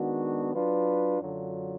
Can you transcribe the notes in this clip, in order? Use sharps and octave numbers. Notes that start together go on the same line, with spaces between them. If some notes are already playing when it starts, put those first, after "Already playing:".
Already playing: D#3 G#3 B3 D4 F#4
F#3 D4 F4 B4
F#2 D3 F#3 D4 F4